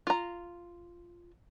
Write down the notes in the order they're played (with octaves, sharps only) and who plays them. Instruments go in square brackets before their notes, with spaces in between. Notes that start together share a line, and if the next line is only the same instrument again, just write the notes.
[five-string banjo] F4 A#5